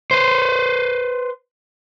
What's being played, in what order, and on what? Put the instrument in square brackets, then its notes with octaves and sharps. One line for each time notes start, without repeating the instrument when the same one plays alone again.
[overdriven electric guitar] B4 C5